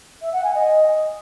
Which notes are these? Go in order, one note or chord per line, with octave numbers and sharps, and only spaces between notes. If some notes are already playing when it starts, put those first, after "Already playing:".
E5
F#5
G#5
D#5